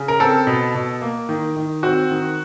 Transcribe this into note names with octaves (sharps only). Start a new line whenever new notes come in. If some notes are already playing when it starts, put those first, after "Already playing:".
Already playing: C#3
A#4
C4 A4
B2
B2
A#3
D#3
D#3
C4 F#4
D#3